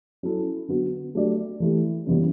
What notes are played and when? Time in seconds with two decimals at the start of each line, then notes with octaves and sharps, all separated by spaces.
0.23 F#3 C#4 E4 A4
0.68 D3 F#3 B3 F#4
1.15 F#3 A3 D4 G4 D5
1.60 E3 A3 E4 G4
2.06 F#2 C#3 E3 G3 B3